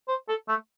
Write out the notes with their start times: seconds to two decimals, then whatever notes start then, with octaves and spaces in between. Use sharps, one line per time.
0.08 C5
0.28 A4
0.48 A3